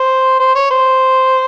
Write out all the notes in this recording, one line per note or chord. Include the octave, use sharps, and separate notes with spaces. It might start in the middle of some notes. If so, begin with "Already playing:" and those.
Already playing: C5
C5
C#5
C5